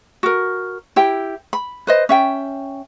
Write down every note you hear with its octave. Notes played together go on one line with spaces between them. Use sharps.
F#4 A#4
E4 G4 G5
B5
B4 C5 D#5
C#4 E5 G5